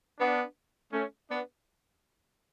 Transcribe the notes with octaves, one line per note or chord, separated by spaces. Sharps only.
B3 D4
A3 C#4
B3 D4